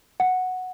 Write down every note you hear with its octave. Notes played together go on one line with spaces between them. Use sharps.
F#5